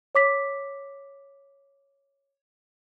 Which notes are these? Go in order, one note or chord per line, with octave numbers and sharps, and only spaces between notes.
C#5 D6 B6